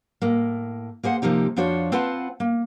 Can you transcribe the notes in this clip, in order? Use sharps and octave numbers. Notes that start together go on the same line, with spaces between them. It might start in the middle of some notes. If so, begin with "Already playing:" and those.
A2 A#3
A#3 G#4 C5 F#5
C3 F3 A#3 D#4 G4
F2 F3 D4 F#4 C5 C#5
C4 F4 B4 C5 F#5 A5
A#3